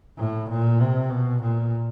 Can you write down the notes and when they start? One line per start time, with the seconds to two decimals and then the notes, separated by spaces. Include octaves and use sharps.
0.18 A2
0.50 A#2
0.80 C3
1.10 B2
1.42 A#2